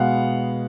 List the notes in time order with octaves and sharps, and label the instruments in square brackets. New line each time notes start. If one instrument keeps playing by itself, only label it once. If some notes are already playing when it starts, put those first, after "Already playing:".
Already playing: [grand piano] B2 G#3 B3 F5 F#5